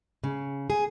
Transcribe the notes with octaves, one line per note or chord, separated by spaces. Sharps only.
C#3
G#4